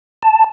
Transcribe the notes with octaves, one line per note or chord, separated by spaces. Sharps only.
A5